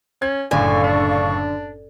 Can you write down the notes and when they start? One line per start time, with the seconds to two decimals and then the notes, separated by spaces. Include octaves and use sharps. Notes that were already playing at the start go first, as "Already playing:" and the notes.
0.22 C#4 G#6
0.51 F#1 A2 D3 A4 F5 G#5 C#6
0.84 D4